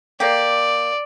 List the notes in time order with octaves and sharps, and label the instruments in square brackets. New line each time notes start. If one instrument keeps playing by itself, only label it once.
[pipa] A#3 G4 [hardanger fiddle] D5